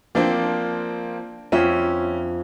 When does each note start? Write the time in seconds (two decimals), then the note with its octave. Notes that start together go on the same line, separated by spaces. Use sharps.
0.15 F3 A#3 C4 D4
1.52 F2 C#4 F4 E5